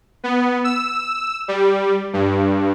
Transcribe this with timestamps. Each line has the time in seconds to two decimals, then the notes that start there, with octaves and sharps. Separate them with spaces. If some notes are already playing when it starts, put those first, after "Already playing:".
0.24 B3
0.64 E6
1.48 G3
2.13 G2